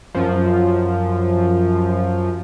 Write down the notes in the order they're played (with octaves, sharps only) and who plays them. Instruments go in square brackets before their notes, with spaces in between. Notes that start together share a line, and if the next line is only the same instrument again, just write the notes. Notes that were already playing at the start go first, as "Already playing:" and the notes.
[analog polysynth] F#2 F3